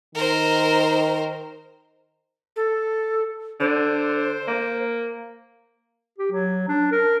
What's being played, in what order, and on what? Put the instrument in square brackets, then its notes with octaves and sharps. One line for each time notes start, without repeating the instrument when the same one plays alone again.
[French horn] D#3 [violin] A#4 C5
[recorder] A4
[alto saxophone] D3 [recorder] C5
[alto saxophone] A#3
[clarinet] G4
F#3
D4
A#4